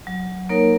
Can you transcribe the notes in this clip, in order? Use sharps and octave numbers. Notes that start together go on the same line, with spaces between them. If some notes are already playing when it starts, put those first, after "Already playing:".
F#3
A#3 D#4 A#4 C#5